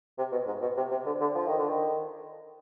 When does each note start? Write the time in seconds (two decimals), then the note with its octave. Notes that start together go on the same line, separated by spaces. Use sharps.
0.18 C3
0.32 B2
0.47 G#2
0.61 B2
0.77 C3
0.91 C3
1.06 D3
1.20 D3
1.35 F3
1.47 D#3
1.58 D3
1.69 D#3